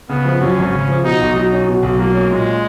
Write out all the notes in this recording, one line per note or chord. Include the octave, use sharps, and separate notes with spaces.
C#3 B3
F3
F#2 C#4
G#1
C#3
F3
B2 D#4
B1
F#3 D#4
C#4
B2
B1
F#3 A#3
C#4
A#2 G#3